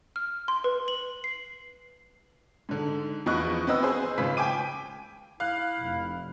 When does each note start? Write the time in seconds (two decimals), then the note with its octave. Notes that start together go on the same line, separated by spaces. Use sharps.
0.16 F6
0.48 C6
0.64 B4
0.88 F#7
1.24 C7
2.69 G#2 D3
3.26 E2 F3 B3 D#5 C#6 F#6
3.67 B3 C4 B4 D#5 E6
3.83 G#4 C5
4.18 G#1 C#3 G#3 F4 B4 B6
4.37 G5 G#5 D6 D#7
5.40 E4 F5 F#6
5.81 F1